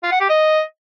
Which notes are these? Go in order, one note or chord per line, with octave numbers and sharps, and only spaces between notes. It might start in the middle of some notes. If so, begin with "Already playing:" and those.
F4
F#5
G4
D#5